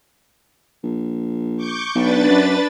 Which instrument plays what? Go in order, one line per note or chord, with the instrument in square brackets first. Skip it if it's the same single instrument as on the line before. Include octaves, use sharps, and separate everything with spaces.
[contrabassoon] A#1
[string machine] C#6 D6 G6
[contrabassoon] B1 [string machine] D4 B4 A6
[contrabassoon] F#2